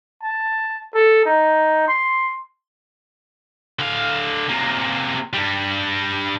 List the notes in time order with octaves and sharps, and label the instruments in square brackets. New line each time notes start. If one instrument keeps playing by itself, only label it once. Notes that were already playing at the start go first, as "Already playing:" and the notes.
[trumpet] A5
A4
D#4
C6
[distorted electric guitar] D3 F5
C3 A#3
G2 G3